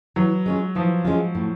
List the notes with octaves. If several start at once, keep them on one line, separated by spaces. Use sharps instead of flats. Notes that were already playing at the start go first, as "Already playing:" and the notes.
E3 F#3
G#3 C#4 F4
E3 F3
G#3 C#4 F4
A2